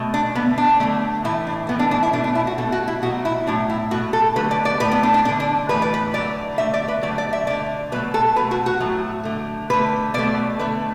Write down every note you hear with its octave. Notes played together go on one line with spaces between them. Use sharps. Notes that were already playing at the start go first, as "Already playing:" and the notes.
Already playing: B2 A3
D4
D3 A3 B3
D4
D3 F#3 A3
A2 E3 A3 E4
D4
A2 E3 A3 B3
D4
D4
E4
B2 A3 D4
D4
E4
F#4
B2 A3 A4
F#4
E4
B2 F#3 A3 F#4
E4
A2 F#3 A3 D4
E4
B2 A3 F#4
A4
D3 F#3 A3 B4
D5
D5
A2 A3 B4
B3
D4
D4
D3 A3 D4
D4
A2 E3 A3 B4
D5
B4
D3 F#3 A3 D5
D3 A3 E5
D5
B4
D3 F#3 A3 D5
D5
E5
D3 A3 D5
B2 F#3 A3 B4
A4
B2 F#3 A3 B4
F#4
F#4
A2 F#3 A3
D3 A3
D3 A3 B4
B2 F#3 A3 D5
D3 A3 B4